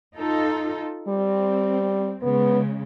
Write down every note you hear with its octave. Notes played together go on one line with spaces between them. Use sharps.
D#4 F4 A4
G3 C4
C#3 G#3 B3